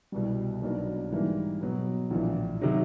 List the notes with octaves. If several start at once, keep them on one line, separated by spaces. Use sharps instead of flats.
C2 B2 G3
B1 B2 F#3 A#3 D4
G#2 E3 G3 A#3
B2 F#3 B3
A#1 A2 E3
C3 D#3 F#3